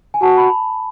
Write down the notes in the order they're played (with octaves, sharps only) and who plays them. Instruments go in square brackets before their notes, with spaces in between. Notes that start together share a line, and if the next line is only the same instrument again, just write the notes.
[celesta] G#5
[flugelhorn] F#4 [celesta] A5
[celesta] B5